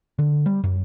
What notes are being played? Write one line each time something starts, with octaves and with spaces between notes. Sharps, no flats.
D3
G3
F#2